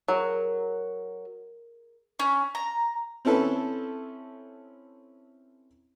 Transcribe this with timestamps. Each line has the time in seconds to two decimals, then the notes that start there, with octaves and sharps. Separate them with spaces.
0.08 F#3 G#4 A#4
2.20 C#4
2.55 A#5
3.25 C4 C#4 E4 A4 B4